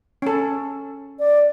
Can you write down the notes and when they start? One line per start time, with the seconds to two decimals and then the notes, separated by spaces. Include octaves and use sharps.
0.22 C#4 A4
1.19 D5